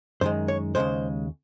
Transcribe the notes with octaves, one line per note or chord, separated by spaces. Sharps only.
F#2 D#3 G#3 C5
C#5
D#2 C#3 G#3 C5